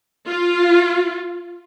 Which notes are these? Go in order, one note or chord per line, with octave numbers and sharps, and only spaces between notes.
F4